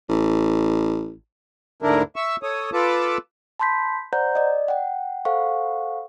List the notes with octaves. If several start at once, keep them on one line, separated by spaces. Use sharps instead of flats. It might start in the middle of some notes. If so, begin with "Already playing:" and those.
A1
D2 G#2 D3 D4 E4 A#4
E5 C#6 E6
A4 C#5 D#6
F4 A4 B4 A5 D6
A5 B5 C6 G6 B6
C5 D5 F#5 A#5 G6
D5 D#5
F#5 G5
A4 C5 F5 F#5 C#6